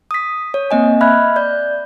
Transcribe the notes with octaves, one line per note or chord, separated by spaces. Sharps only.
D#6 B6
C#5
A#3 C4 D#5 G#5
D#5 E5 B5 F6 F#6 G#6
D5 G6